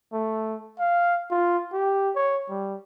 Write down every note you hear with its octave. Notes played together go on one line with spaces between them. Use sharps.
A3
F5
F4
G4
C#5
G3